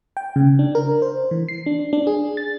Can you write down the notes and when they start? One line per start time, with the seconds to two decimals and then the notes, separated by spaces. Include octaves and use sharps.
0.17 G5
0.36 C#3
0.59 D4
0.75 A#4
1.02 C5
1.31 E3
1.49 C7
1.66 D4
1.93 D4
2.07 G#4
2.37 A6